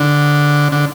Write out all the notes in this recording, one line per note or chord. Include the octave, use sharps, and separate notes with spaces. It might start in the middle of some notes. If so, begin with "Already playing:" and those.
Already playing: D3
D3